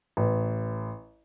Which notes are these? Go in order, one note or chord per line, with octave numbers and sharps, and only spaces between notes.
A1